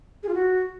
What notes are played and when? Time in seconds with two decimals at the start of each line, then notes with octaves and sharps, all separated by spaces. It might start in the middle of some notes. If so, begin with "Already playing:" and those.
0.23 G#4
0.29 F4
0.34 F#4